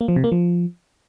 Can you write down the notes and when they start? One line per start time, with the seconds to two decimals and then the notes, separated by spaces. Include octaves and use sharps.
0.01 A#3
0.08 F3
0.16 C3
0.24 A#3
0.32 F3